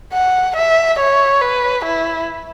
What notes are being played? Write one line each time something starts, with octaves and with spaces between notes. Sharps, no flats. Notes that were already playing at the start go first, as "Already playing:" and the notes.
F#5
E5
C#5
B4
E4